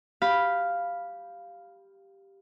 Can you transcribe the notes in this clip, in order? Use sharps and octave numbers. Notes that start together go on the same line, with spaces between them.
G4 F5 B5